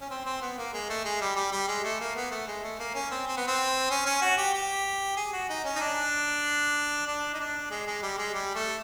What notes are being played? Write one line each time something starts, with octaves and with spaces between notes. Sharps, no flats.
C#4
C4
C4
B3
A#3
G#3
A3
G#3
G3
G3
G3
G#3
A3
A#3
B3
A3
G#3
A3
A#3
C#4
C4
C4
B3
C4
C#4
C#4
F#4
G4
G4
G#4
F#4
D#4
C#4
D#4
D4
D4
D#4
D4
G#3
G#3
G3
G#3
G3
A3